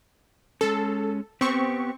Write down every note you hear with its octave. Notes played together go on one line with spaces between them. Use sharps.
G#3 C#4 A4
B3 C4 G4 C#6